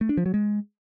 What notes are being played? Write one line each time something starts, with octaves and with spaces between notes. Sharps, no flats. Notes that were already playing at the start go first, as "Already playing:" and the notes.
A3
D4
F3
F#3
G#3